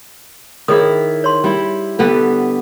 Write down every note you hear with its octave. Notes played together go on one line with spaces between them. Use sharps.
D#3 E4 G#4 C#5 D#6
C#5 C6
G3 E4
D3 G3 B3